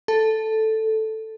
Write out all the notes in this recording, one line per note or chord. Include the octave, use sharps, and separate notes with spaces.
A4